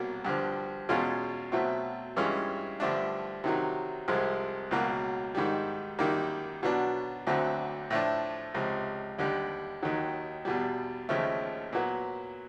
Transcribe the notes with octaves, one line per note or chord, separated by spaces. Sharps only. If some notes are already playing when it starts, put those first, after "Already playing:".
Already playing: C2 B2 F#3 A#3
G2 D3 F3
E2 B2 G#3 C#4 F4
B2 F#3 A3 C4
G2 E3 G#3 C#4 F4
G2 D3 F3 A3 D4
C3 D#3 F#3
C2 C3 F3 G#3
C#2 B2 F#3 A#3
G#2 D#3 G3
F#2 D#3 G3 A#3
B2 F#3 B3 D4
D2 D3 F#3 A3 C4
A2 F3 A3 D4
C#2 C3 F3
D#2 D3 G3
D#2 D#3 F#3
E2 B2 G3
D#2 C#3 F3 A3
A#2 F#3 B3